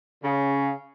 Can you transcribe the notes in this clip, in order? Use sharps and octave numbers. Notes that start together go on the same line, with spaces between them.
C#3